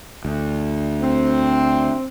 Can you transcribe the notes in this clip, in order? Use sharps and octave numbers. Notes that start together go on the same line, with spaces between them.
D2
C4